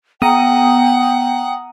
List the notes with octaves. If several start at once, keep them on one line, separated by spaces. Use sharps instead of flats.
B3 F#5 G5 A#5 D#6